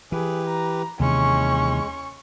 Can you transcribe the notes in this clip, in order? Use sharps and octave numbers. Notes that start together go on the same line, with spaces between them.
E3 G4 G#4 B4
A#5
D#2 C3 E3 G#3 C#4 C#6